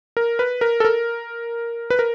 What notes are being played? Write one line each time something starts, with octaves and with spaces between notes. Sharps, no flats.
A#4
B4
A#4
A4
A#4
B4
A#4